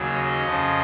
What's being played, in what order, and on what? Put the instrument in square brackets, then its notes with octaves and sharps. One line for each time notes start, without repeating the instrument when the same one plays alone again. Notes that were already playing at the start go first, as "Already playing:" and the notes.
Already playing: [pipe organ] D#2 C#3 F#3
D#5
F2 C#3 F3